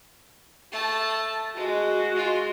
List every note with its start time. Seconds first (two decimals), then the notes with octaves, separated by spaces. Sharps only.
0.72 A3 A5
1.56 G#3 F#4
2.14 G#3 F4